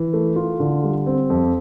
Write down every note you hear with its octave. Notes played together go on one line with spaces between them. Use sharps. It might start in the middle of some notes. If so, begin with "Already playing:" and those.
Already playing: E3
A3
F4
D3
G3
C4
F2